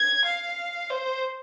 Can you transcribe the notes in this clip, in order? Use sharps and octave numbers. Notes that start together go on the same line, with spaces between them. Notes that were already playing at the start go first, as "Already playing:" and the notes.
Already playing: G#6
F5
C5